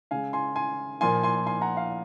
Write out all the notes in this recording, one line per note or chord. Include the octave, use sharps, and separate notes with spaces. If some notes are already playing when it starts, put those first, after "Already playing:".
C#3 G#3 F5 G#5
G#5 C6
G#5 C6
A#2 F3 A#3 G#5 C6
G#5 C6
G#5 C6
F#5 A#5
F5